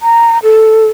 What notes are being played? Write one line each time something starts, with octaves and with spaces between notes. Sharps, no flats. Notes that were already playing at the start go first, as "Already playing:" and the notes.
A#5
A4